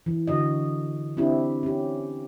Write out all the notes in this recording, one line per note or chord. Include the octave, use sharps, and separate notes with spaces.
E3
D3 F#4 D#5
C4 D4 E4 G4
C#4 G4